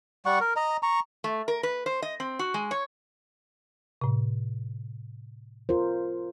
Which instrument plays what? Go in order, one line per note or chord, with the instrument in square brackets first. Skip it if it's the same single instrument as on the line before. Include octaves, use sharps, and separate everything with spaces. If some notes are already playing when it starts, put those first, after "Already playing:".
[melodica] G3 F#5 C#6
A#4
D#5 A#5
A#5 C#6
[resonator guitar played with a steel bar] A3
A#4
B4
C5
D#5
C4
F#4
G#3
C#5
[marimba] A2 C3
[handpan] F4 A#4 C5